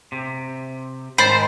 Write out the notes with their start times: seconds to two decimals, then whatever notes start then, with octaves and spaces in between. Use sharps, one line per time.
0.12 C3
1.18 G#2 D#3 C5 B5 A6